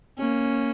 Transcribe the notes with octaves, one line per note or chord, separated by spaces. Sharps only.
A#3 C#4